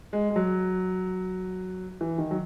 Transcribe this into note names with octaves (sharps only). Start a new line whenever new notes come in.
G#3
G#3
F#3
E3
D#3
F#3